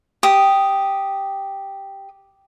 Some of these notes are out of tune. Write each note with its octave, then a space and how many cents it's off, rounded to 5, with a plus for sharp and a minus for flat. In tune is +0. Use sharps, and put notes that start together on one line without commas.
G4 +0 D#6 +0